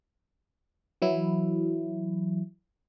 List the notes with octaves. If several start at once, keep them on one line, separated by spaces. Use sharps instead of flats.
E3 F#3 E4